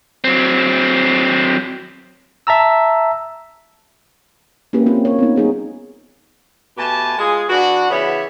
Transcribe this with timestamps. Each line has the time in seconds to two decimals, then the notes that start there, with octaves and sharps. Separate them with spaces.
0.24 F#3 C4
2.47 E5 A5 A#5 E6
4.73 A#3 C#4 E4 G4 B4
4.86 C4 C#4 F4 G4
5.05 A#4 C#5
5.19 B3 C4 D#4
5.36 G3 D#4 G#4 C#5
6.77 B2 A3 G4 G#5 A5
7.18 G#3 F4 G#4
7.49 E3 D4 F#4
7.90 C#3 E3 B3 C#5 E5